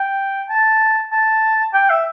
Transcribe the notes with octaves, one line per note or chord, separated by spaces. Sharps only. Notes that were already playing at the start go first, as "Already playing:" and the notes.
Already playing: G5
A5
A5
G5
E5